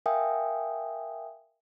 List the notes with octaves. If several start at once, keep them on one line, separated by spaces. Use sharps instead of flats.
A#4 E5 F5 G5 G#5 D#6